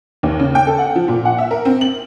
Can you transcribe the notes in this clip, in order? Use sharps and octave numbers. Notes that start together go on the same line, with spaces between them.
D#2
C#3
G5
A4
F#5
F3
A#2
F#5
E5
A#4
C4
F#7